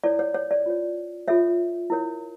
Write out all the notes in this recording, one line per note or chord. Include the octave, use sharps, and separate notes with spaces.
E4 A4 C#5 D5
C#5
C#5
D5
F4 C#5
F4 A4 C#5 E5
E4 A#4 C#5